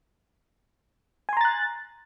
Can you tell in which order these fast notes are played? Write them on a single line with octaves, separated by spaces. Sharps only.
G#5 C6 A#5 A6 F#6